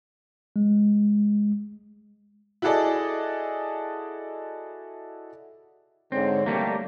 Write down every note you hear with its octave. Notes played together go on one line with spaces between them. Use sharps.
G#3
E4 F#4 G#4 A4 D5 D#5
G#2 D3 C4 C#5
G3 A3 A#3 G4